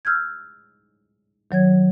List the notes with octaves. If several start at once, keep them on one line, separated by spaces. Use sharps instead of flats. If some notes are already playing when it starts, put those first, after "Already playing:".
E6 F6 G6 G#6
D#3 F#3 C#5 G#6